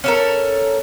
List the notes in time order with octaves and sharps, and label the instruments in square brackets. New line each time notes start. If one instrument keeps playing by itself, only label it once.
[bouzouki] C#4 A4 A#4